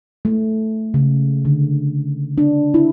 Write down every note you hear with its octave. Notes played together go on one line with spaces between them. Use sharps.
A3
C#3
D3
D4
E4